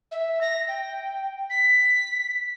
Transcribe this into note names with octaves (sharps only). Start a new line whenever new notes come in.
E5
A#6
G5
B6